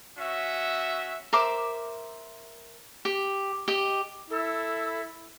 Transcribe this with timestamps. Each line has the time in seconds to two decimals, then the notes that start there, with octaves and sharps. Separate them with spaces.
0.19 C#4 F#4 E5
1.33 A#4 C5 E5 D6
3.05 G4
3.68 G4 D#5
4.30 E4 A4